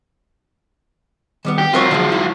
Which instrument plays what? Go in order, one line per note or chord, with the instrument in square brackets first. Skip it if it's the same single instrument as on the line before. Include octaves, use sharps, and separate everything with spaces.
[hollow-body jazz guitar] D#3 G3 B3
[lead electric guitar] G4
[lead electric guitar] F#3 F4 [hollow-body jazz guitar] C4 A#4 C#5
[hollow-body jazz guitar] D3 F3 G#3
E4